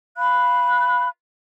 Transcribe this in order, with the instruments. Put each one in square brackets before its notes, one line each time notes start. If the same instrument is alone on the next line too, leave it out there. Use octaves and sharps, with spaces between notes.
[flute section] F5 B5 F#6